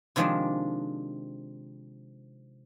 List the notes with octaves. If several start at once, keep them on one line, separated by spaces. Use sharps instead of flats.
C3 D#3 F3 G#3 C4 D4